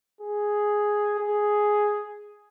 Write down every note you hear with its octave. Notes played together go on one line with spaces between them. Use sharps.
G#4
G#4